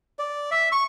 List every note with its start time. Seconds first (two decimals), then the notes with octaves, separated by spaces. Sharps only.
0.19 D5
0.51 E5
0.72 C#6